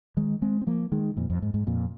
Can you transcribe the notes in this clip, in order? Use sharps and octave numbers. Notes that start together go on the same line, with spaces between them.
D#3 G#3
G#3 C4
C4
F3 A#3
D#3 G#3
F2 A#2
F2
G#2
G#2
F2 A#2